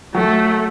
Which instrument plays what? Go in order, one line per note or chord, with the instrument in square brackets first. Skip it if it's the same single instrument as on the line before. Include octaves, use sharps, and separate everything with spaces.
[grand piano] F#3 [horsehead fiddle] A3